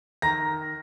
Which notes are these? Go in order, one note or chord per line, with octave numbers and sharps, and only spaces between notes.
D#3 A#5 A#6